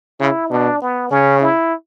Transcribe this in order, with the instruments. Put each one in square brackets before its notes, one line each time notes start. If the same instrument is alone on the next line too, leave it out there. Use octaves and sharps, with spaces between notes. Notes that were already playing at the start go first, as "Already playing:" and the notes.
[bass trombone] C#3 [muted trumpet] E4
[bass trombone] B2 [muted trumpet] D4
[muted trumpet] B3
[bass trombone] C#3 [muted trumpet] C#4
[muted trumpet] E4